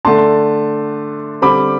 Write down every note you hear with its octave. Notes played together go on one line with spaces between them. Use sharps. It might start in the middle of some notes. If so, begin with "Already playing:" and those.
D3 A3 D4 A5 C6
D3 G3 C4 B5 D6